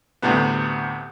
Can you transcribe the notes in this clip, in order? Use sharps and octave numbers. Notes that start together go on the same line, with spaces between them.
D2 A2 C3 G3 B3